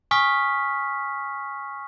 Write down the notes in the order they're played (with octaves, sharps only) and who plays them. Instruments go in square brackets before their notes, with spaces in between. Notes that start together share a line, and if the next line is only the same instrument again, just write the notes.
[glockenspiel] G#5 C#6 D#6 F6 B6